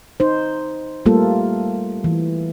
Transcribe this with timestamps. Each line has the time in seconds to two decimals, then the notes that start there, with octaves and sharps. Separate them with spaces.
0.20 D#4 C5
1.06 G3 A3 A#3 F4 A4
2.04 E3